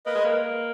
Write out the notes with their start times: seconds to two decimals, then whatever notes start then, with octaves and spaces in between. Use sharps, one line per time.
0.06 A#3 B4 D#5
0.15 G#3
0.24 A#3